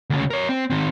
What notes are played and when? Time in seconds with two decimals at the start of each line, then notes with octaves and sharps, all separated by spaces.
0.10 D2 C#3
0.30 A#4 C#5
0.49 C4
0.70 D#3 C4